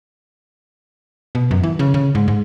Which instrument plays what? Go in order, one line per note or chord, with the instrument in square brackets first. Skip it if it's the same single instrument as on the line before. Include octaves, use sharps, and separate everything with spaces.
[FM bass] B2
F#2
E3
C#3
C#3
G#2
G#2